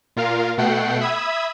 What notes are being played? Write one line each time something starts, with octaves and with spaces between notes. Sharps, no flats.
A#2 F4 A#4 F5
B2 A3 F#5 G5 C7
E5 B5 D#6 E6 G#6